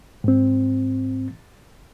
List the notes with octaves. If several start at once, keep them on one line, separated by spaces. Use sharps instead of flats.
G#2 C4